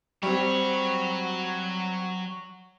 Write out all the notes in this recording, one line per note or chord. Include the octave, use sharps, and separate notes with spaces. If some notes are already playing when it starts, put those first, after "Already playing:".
F#3 G3 C4 C#5